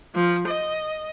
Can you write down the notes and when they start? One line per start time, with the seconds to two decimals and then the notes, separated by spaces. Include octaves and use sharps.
0.13 F3
0.46 D#5